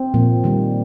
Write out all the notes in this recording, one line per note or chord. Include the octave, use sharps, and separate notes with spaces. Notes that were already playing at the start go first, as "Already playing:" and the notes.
Already playing: C4
A#2 F3 A#3
D#3 G3 A#3